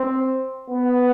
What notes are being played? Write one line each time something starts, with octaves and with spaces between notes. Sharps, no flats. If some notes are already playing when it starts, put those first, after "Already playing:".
Already playing: C4
B3